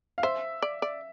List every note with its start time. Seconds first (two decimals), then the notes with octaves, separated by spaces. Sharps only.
0.18 F5
0.23 C5 E5
0.62 D5
0.82 D5